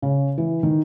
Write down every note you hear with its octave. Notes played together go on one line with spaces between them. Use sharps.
C#3
E3
D#3